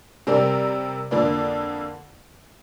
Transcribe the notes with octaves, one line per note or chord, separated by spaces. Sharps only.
C3 G3 C4 A#4 D5
F2 D3 A#3 F4 D5